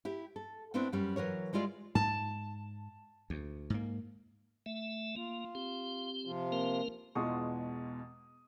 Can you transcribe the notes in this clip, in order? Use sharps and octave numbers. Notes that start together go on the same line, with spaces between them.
E4 G4
A4
A3 B3 C4 D4 E4
F#2 G3 C#4
E3 F#3 A#4 C#5
G3 G#3 E4 F4 D5
G#2 A5
D2
G#2 A#3
A3 E5
A#3 F4
C4 G4
C3 F3 F4
A#3 C4 A#4
E2 B2 G#3 F4 C#6 D#6